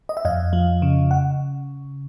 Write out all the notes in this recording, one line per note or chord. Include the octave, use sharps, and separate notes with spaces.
D#5
E5
F2 D#5 F5
F3
C#3
F#5